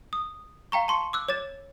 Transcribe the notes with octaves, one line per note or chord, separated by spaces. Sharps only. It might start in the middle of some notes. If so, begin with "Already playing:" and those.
D#6
F5 G5 A#5 C#6
A5 C6 C#6 C#7
D6 E6 F#6
C#5 D6 A6 E7